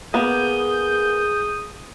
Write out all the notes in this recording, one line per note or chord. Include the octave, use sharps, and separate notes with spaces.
A#3 B3 G#4 D#6 G6